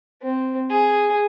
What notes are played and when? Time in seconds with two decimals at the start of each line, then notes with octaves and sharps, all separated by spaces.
0.22 C4
0.70 G#4